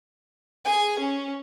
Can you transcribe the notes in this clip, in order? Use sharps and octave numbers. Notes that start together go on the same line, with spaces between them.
G#4 G#5
C#4